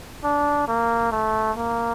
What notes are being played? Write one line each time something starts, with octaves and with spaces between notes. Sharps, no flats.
D4
A#3
A3
A#3